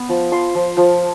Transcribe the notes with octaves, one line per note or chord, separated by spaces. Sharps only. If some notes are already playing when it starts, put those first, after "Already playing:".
Already playing: B3
F3
F3 C6
F3
F3